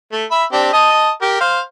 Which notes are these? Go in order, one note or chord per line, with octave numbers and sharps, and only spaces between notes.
A3
E5 B5
C4 D4 G4
D#5 A5 D#6
G4 A#4
C5 F5